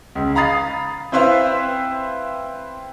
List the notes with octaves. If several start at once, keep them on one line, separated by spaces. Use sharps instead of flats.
C#2
F5 A#5 B5 D#6 A6 C7
C4 E4 B4 C5 E5 F5